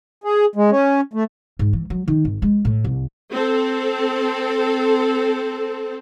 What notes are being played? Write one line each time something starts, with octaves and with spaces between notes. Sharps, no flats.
G#4
G#3
C#4
A3
G#2
E3
F#3
D#3
G#1
G#3
A2
C2
C4 A4